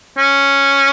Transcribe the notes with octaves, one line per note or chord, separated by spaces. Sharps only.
C#4